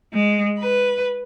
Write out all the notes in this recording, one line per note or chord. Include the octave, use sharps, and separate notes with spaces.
G#3
B4